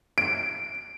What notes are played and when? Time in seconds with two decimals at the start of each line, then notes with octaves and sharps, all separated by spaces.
0.18 D7